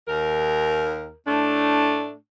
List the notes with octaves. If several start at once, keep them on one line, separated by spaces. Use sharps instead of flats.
D#2 A#4
A2 A3 D4